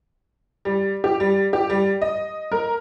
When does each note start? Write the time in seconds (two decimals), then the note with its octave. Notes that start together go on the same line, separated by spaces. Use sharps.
0.65 G3
1.04 G4
1.20 G3
1.53 G4
1.70 G3
2.02 D#5
2.52 A#4